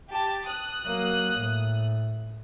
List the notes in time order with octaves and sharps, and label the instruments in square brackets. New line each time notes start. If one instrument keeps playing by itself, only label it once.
[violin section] G4 A5
D#6 F#6
[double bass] F#3 A#3
A2